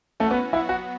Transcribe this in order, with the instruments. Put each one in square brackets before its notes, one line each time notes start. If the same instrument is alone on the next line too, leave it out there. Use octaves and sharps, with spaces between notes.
[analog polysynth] E3 C#4 F#4 [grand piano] A3
[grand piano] B3
[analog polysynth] F#3 B3 F#4 [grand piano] E4
[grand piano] F#4